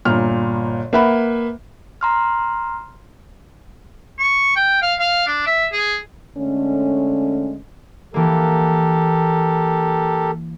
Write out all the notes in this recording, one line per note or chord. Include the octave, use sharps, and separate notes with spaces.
G1 A#2 F6
A#3 B4 E5 F#5 B5
A#5 C6 F6
C#6
G5
F5
F5
D4
E5
G#4
D3 G#3 A3 C#4
E3 A#3 G4 A4 A#4